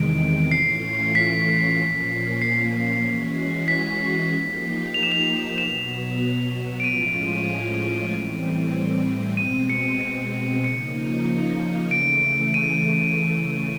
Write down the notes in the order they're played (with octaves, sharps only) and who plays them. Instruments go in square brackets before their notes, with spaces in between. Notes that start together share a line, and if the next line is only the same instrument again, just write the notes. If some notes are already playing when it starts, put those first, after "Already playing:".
Already playing: [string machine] E2 C3 D#3 G#3 [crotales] D7
[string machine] A2 E3 A3 C#4 F4 [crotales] C7
[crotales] B6
[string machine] A#2 F3 A#3 C#4
[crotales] C7
[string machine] E3 G#3 C#4 F#4
[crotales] B6
[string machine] F3 A#3 D#4 G4
[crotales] F7
E7
F7
[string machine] B2 F#3 B3 [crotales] E7
[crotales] D7
[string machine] A2 F3 G#3 C#4 F4 [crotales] D#7
[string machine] A2 E3 G3 C4
[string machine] B2 G#3 C4 [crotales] D#7
[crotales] C#7
C#7
[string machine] C#3 F3 A#3 D#4 [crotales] C#7
[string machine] C#3 E3 A3 [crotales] D7
[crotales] D#7